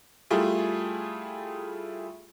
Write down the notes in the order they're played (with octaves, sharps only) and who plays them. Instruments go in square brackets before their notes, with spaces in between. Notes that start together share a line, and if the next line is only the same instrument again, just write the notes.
[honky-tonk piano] G3 A3 E4 F4 G#4